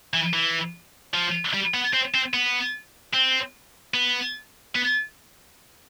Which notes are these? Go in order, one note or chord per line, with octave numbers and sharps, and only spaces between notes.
E3
E3
F3
G3
B3
C4
C4
B3
C4
B3
B3